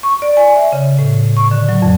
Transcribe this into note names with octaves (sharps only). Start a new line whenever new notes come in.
C#6
D5
G#5
E5
C#3
A2
C#6
D3
F#3
F2